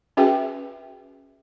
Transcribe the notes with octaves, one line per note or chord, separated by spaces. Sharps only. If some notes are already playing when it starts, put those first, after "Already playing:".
C#4 F#4 G#4 B4 E5 G5